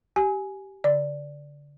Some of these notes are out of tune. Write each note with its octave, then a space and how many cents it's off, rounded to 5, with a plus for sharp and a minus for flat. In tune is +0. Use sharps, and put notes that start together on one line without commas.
G4 -15 G#5 +5
D3 -40 D5 +0